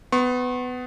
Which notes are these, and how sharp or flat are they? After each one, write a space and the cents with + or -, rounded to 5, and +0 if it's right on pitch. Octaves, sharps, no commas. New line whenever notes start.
B3 +20 C#6 -45